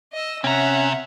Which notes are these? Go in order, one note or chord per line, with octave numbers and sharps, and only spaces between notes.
D#5 E6
C3 C4 C#4 E5 F#5 A#5